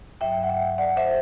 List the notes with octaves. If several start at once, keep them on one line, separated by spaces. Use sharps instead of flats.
G2 F#3 E5 G5
F#5
E5 G5
D5 F#5
C5 E5